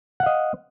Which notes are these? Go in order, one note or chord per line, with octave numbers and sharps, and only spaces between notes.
D#5 F5 F#5